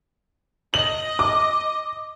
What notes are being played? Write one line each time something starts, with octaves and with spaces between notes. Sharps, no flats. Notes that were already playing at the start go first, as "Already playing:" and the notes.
D#5 F#7
D6